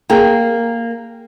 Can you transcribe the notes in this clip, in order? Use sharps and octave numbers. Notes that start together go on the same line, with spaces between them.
A#3 G#4 A#4 G5